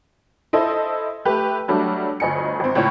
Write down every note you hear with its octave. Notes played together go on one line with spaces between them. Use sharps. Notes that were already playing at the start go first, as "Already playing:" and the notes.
E4 A4 C5 D#5
A3 G4 B4
F#3 G3 A3 D4
G1 D2 D#5 G#5 C#7
G#1 C4
C#2 A2 C#5